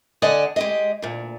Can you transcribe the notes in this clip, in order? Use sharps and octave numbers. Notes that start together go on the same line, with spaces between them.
D3 D5 D#5 F#5 G#5
G#3 G4 D#5
D2 A#2